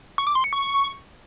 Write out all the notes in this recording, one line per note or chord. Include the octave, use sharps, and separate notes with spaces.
C#6
D6
C6
C#7
C#6